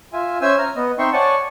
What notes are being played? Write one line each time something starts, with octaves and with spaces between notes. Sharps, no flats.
F4 E5 G#5
C#4 C5 E5 G#5 E6
A#5 F6
B3 D#5
C4 D#4 E5 G5 C6 C#6
C#5 D5 F#5 G#5 A5 C#6